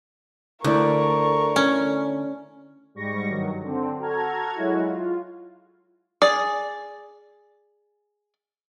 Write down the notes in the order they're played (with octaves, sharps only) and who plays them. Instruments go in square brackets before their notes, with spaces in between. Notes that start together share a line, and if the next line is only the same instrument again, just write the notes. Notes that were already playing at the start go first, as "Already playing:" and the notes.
[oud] D2 [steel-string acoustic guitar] D3 E4 D5 [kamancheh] A#4 C#6
[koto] C#4
[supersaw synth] G#2 G3 C#6 A#6
G2 D#3 F#3
D3 C4
F#4 A4 A#5 F6 G#6
F#3 G#3 E4 F#4
F4
[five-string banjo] G#4 D5